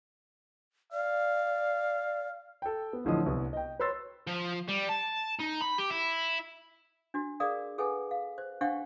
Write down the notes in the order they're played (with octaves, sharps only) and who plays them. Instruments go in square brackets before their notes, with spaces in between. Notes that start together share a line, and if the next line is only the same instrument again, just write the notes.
[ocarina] D5 [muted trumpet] F5
[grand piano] A4 G5
B3
A1 A2 D3 F3 D#5 D#6
C2 B3 D#6
D#5 G5
B4 C#5 C6 E6 A6
[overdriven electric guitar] F3
G3
A5
D#4
B5
G4
E4
[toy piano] D4 F#4
G#4 A#4 D5 F5 D#6
G#4 A4 B4 F#5 G#5
F5
C5
D4 G4 C5 F5 F#5 C#6